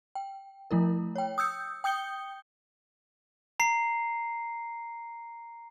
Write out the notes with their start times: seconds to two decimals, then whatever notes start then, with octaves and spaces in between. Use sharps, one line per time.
0.15 G5
0.71 F3 A3 E4 A#4
1.16 C#5 G5
1.38 D#6 E6 G6 C#7
1.84 G5 D#6 G6 C#7 G7
3.60 A#5 C7